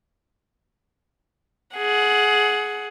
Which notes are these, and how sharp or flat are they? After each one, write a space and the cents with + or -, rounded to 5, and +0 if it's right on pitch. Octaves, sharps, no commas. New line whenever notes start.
G#4 +15 F#5 +0